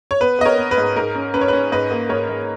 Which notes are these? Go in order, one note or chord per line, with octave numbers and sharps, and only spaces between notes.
C#5
B3 B4
B3 D#5
A#4 C#5
B3
B4
G#2
G#2 A#4
C#4
C#4 B4
C#5
C#4 B4
G#2 B4 D#5
A#3
G#2 A#4 C#5
G#2